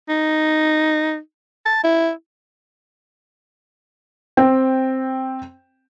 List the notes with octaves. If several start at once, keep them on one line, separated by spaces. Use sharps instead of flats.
D#4
A5
E4
C4 G5